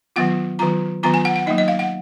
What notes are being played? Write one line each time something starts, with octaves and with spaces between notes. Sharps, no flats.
D#3 F#3 B3 F4 F#5
D#3 F#3 B3 F4 A#5
D#3 F#3 B3 F4 A#5
G#5
F#5
F#5
F#3 A#3 D#4 D#5
D#5
F5
F#5